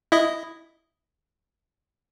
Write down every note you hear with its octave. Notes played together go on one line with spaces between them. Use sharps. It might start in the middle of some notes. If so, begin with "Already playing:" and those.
E4 D#5